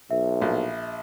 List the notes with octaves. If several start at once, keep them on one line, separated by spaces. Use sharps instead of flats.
B1 E5
A#1